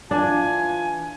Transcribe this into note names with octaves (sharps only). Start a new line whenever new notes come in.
E3 D4 F4 G#5